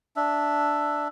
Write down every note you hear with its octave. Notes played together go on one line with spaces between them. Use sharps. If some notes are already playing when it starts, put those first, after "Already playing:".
D4 E5